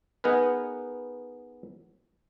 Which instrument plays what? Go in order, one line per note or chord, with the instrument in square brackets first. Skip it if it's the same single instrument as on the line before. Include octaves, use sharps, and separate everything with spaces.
[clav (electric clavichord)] B3 D#4 G#4 A#4 B4